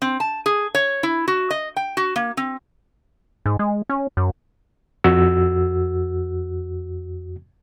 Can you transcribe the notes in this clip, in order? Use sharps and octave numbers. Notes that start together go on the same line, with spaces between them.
C4
A5
G#4
C#5
E4
F#4
D#5
G5
F#4
A#3
C4
G#2
G#3
C#4
F#2
F2 F#4 E6